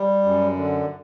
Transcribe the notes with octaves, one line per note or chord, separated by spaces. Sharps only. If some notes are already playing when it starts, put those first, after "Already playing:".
Already playing: G3
F#2
D3